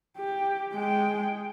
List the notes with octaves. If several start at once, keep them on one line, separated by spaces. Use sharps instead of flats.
G4
G#3 G5